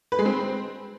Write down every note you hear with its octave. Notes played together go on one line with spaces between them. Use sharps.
B4
G#3
C4